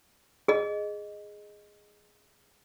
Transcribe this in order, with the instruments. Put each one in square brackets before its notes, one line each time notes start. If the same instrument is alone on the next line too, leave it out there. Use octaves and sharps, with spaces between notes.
[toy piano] G#4 D#5